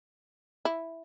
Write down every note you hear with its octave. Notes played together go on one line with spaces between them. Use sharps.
E4